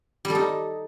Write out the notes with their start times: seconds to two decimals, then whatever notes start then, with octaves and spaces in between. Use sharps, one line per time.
0.25 G3
0.30 A4
0.35 D#4